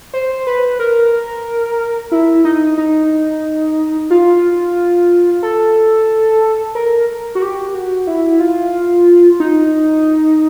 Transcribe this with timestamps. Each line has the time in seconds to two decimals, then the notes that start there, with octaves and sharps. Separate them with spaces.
0.14 C5
0.47 B4
0.79 A#4
2.12 E4
2.45 D#4
2.78 D#4
4.10 F4
5.43 A4
6.75 A#4
7.35 F#4
7.42 G4
7.75 F#4
8.07 E4
8.40 F4
9.40 D#4